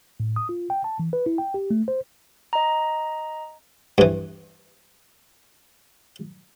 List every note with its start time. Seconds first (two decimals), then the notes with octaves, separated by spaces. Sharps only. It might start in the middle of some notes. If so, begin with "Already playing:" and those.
0.20 A2
0.36 D#6
0.49 F4
0.70 G5
0.84 A5
0.99 E3
1.13 B4
1.26 E4
1.38 G5
1.54 G4
1.71 A3
1.88 C5
2.53 D#5 A#5
3.98 G2 E3